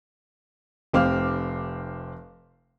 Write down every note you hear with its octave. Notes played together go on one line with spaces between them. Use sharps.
F1 C4 F5 D6 F6